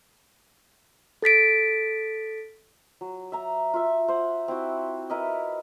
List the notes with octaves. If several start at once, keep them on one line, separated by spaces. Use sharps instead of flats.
A4 A6 B6 D7
F#3
E5 A#5
F4 E5
C5 F#5
C4 E4 F#4
E4 A#4 B4 D#5